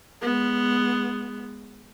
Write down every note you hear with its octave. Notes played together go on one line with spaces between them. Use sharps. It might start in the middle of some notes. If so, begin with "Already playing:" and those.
G#3 B3